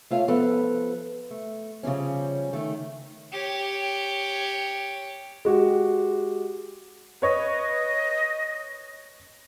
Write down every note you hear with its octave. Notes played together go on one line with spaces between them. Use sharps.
A3 F4 C#5 F5
F3 B3 A4 B4
A3
C#3 F3 G3 C#4
D#3 A3
G4 C#5
G#3 F#4 G4
B4 C#5 D#5